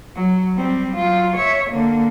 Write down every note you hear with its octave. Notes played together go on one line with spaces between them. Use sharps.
F#3
G3 C4
F#3 F4
C#5 E5
D3 A#3